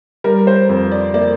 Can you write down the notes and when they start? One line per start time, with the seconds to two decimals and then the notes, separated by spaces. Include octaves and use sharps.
0.24 G3 A#4
0.47 C5
0.69 F2
0.92 D5
1.14 A#3 D5